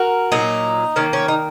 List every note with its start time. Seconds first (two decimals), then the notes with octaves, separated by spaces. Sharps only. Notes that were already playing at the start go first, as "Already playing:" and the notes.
Already playing: F#4 A#4
0.32 A#2 F#3 A#3 D#4
0.96 D#3 A#3 C#4
1.13 C#4
1.28 D#4